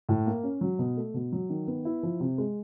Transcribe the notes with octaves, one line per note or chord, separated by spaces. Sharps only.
A2
A#3
C#4
F#3
B2
A3
B2
F#3
D#3
B3
E4
F3
C3
G#3